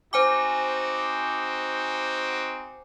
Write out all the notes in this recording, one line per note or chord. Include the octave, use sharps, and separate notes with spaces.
C4 D#4 F#4 C5 G#5 D6